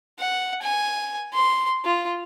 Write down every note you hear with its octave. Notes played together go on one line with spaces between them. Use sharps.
F#5
G#5
C6
F4